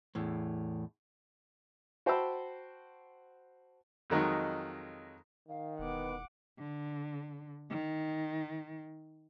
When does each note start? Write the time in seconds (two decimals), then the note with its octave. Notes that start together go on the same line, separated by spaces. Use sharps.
0.15 E2 A2
2.06 F#4 C5 G5 A5 B5 E6
4.10 F2 D#3 F#3 G#3
5.48 D#3 F5
5.79 E1 B3 F#5 D6
6.59 D3
7.70 D#3